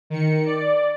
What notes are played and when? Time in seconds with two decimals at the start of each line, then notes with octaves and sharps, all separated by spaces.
0.10 D#3 C#7
0.46 D5